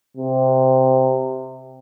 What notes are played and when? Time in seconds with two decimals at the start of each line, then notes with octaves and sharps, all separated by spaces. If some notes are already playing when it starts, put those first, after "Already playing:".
0.17 C3